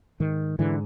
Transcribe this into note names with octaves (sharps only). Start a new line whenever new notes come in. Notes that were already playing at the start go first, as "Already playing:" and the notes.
G#2 D#3
G#2 D3 E3